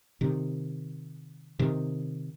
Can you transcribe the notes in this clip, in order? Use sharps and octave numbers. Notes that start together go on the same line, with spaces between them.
C3 D#3
C3 D#3